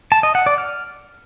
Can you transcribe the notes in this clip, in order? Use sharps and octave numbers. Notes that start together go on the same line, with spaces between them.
A5
D#5
F#5
D5
F6